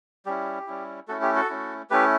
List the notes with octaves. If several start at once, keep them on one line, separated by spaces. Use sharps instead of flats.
G3 C#4 E4 G4
G3 C#4 E4
A3 C#4 E4 F#4 A4
G4
F#4 A4
A3 C#4 E4
A3 C#4 E4 G4 B4